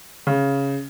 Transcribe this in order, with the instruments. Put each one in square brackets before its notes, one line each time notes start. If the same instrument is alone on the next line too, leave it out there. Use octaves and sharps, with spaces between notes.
[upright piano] C#3